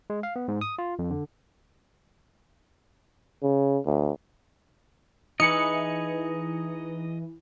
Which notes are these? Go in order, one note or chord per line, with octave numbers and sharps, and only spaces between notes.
G#3
F5
B3
G#2
D#6
F4
F2
D3
C#3
D2
E3 D#4 G#4 B4 D#5 C#7